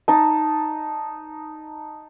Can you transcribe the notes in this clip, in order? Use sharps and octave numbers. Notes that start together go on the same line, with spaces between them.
D#4 A5